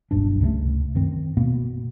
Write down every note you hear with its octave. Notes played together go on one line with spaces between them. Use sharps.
F#1 B1 G2 D4
C#2 C3 G3 A3
F#2 D#3 C4
B2 A#3 B3